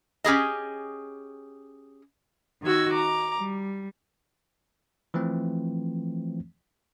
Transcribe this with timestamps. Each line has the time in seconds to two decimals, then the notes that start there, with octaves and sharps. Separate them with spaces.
0.24 C#4 G4 G#4 D#5
2.64 D#3 D#4 F#4 E6 G#6
2.92 A#5 D6
3.39 G3
5.14 E3 F3 A3 C4